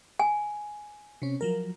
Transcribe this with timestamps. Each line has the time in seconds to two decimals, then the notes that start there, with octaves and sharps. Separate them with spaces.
0.19 G#5
1.22 C3 C#4
1.41 F3 F#3 A#4